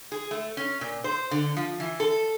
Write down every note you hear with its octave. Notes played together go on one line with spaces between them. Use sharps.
G#4
A3
C#4
A#2
C5
D3
F3
E3
A4